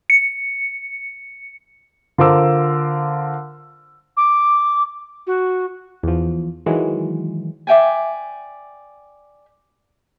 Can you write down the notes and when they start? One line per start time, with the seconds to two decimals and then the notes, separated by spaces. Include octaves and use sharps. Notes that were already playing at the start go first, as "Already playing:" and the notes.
0.10 C#7
2.18 D3 F4 A#4 C5 D6 E6
4.17 D6
5.27 F#4
6.03 E2 F3
6.66 D#3 E3 F#3 G#3
7.67 D5 E5 G5 G#5